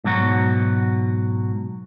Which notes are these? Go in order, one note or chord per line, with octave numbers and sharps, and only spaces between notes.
G#2 B2 F#3 F#4